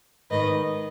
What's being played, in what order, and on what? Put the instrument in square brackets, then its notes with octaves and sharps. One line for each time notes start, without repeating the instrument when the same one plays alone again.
[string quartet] G#2 D#3 B4 D#5